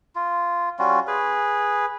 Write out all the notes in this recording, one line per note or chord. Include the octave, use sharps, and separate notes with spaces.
F4
G3 C#4 F4 F#4
G#4 B4